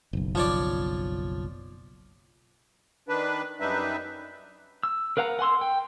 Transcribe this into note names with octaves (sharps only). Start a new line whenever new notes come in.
F#1 B1
F3 C#5 D5
D#3 D4 B4
F#2 G3 D4 D#4 B4 E5
E6
A#4 B4 F5 F#5 A#5
F#5 G#5 C6 E6
G5